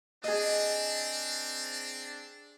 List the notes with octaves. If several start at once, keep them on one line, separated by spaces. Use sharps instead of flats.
C4 D4 G#4 D#5